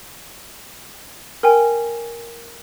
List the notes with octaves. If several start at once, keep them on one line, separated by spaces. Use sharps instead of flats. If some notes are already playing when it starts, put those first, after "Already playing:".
A#4 G5 G#5